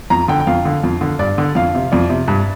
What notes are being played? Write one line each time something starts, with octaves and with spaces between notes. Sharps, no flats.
F2 A#5
D3 G5
G5
F2 F5
D3
F2
D3
G2 D5
D3
F2 F5
C3
F2 D5
C3
G2